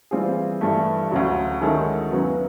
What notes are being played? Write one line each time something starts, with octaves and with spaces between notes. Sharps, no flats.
E3 G3 C4 F4 G#4
G2 E3 A3
D2 C#3 F#3
D#3 G#3 C#4 E4 A4
F#2 C#3 F#3 B3